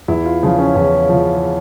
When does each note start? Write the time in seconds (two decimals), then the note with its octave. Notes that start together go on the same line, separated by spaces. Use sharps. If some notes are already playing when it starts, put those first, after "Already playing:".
0.08 E2 E4
0.25 F4
0.43 C#3 F3 F4
0.59 C#4
0.75 E2 C#4
1.09 C#3 F3